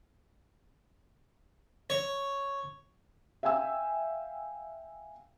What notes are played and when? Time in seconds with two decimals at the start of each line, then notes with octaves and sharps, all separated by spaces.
1.90 C#5
3.43 E5 F5 G5 G#5 E6